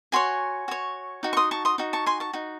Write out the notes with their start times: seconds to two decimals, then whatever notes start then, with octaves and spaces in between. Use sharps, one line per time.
0.12 F#4 C#5 G#5 C6
0.68 F#4 C#5
1.23 D#4 F#4
1.33 C#6
1.37 C6 D#6
1.51 A5 C#6
1.65 C6 D#6
1.78 D#4 F#4
1.93 A5 C#6
2.06 G#5 C6
2.20 A5 C#6
2.33 D#4 F#4